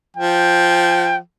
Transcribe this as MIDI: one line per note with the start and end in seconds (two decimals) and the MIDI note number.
0.17 1.19 53
0.17 1.17 79